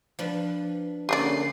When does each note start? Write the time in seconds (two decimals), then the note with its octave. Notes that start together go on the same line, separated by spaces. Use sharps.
0.19 F3 D4 B4
1.09 D3 A#3 C#4 G4 G#4 D5 C7